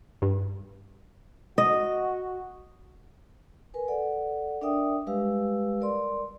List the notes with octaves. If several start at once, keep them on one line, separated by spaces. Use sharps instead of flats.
G2
F#4 D#5
A#4 B4 G#5
A4 D5 F#5
D4 A#4 D5 E5 G5 D#6
G3 G#3 G4 B4 F5 E6
A#4 D5 C6